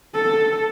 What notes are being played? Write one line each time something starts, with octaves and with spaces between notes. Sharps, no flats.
A4